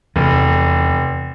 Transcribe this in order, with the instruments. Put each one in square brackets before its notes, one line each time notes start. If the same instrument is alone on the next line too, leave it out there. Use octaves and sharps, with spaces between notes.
[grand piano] F1 [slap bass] E2